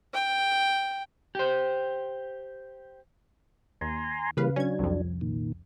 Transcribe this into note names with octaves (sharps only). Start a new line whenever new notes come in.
G5
G4 C5
D#2 G#5 A#5 C6
C#3 E3 G3 A#3 B4 F5
F#3 C#4 D4 G#6
C2 F2
A#2 D#3